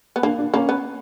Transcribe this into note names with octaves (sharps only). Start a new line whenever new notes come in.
B3
A#3 D4
D4
A#3 C#4
B3